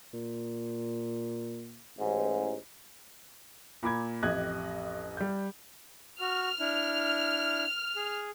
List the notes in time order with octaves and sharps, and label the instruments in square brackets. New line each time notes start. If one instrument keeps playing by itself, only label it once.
[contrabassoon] A#2
[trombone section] A1 G#2
[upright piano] A#2 B5 D6 G#6
A1 F2 G4 D#5 F#6 G#6
G3 G6
[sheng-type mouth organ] F#4 [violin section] F6
[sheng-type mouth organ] D4 E4
G#4